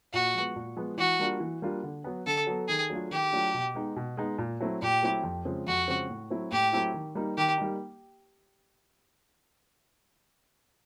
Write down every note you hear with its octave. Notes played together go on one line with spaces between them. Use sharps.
A#2 F#4
F3 G#3 B3
A#2
F3 G#3 B3
E3 F#4
G3 A#3 D4 F4
E3
G3 A#3 D4 F4
D3
F#3 B3
D3 A4
F#3 B3
D#3 G#4
F#3 A3 D4 F4
D#3 G4
F#3 A3 D4 F4
B2
G#3 B3 D#4
B2
G#3 B3 D#4
A#2
F#3 A3 C4 E4
A#2 G4
F#3 A3 C4 E4
F2
C#3 F3 G#3 C4
F2 F#4
C#3 F3 G#3 C4
A2
F#3 A3 C4 E4
A2 G4
F#3 A3 C4 E4
D#3
G3 A#3 D#4
D#3 G4
G3 A#3 D#4